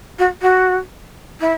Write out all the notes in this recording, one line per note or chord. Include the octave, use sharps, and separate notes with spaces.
F#4
F#4
E4